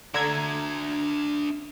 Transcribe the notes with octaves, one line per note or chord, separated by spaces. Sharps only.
D3 D4 E5 A#5 G#6